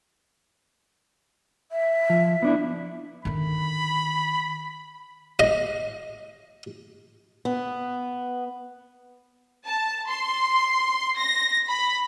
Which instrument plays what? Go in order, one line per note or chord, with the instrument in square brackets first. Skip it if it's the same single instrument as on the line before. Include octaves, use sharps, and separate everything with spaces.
[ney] E5
[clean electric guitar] F3
B3 D4 E4
[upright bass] D3 D#3 [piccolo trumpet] B5
[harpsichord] D#5
[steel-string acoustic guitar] B3
[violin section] A5
C6
A#6
B5